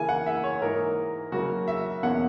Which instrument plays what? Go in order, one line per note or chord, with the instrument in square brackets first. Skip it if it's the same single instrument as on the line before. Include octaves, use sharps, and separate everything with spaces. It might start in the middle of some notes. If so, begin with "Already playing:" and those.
Already playing: [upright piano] C#3 E3 A#3 E4 G#5
F#5
E5
C#5
G#2 E3 A#3 D#4 A#4
C#3 F#3 A#3 E4 F#4
E5
E2 B2 A#3 C#4 F#5